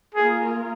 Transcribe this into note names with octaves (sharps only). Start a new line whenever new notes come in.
A#3 F4 G#4 A#4